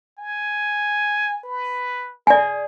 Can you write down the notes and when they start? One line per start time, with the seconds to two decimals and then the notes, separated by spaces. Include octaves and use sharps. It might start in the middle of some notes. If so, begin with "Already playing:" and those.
0.18 G#5
1.44 B4
2.27 G#4 D5 G#5